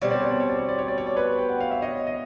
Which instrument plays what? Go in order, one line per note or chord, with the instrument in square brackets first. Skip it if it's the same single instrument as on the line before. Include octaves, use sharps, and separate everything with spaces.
[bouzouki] B2 G3 C4 [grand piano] C#5
[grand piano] D5
C#5
D5
C#5
D5
C#5
D5
C#5
D5
C#5
D5
B4 C#5
G5
F#5
F5
E5
C#5 D#5
D#5